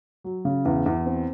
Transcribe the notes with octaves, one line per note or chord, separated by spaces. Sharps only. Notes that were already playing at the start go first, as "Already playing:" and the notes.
F#3
C#3
E2
E2
C4